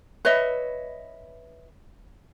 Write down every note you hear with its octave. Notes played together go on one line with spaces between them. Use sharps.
B4 C#5 D#5 E5